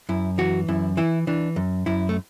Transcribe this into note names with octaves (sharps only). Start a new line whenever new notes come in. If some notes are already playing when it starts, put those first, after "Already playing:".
F#2 E4
E3 F#4
F#2 E4
E3 E4
E3 D4
F#2
F#2 E4
A3